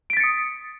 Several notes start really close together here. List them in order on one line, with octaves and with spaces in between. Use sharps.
D7 B6 A6 C#7 D#6